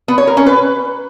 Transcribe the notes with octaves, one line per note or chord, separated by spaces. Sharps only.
B3
C#5
A#4
C#4
B4